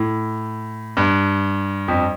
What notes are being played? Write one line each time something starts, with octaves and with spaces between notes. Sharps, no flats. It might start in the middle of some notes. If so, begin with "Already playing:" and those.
Already playing: A2
G2
F2